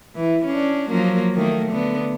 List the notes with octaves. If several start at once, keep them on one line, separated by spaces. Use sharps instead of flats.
E3
C#4 D4
F3 F#3 A#3
D#3 A3 A#3
D3 B3